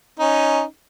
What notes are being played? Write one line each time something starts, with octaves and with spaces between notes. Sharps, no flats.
C#4 D#4